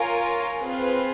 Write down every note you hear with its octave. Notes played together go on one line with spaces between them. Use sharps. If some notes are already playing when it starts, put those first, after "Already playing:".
Already playing: F4 A#4 C#5 F5 G#5
C4 F4 G#4 B4